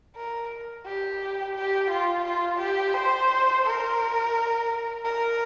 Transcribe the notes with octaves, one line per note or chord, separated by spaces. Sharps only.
A#4
G4
G4
F4
F4
G4
C5
A#4
A#4